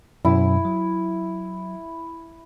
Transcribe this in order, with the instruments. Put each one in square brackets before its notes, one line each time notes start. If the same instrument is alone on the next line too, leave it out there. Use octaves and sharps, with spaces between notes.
[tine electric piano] F#2 B2 F#3 [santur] E4
[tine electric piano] F#3